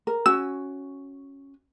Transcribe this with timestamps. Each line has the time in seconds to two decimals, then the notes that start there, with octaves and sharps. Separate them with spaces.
0.07 A#4
0.26 C#4 F#4 G#5 E6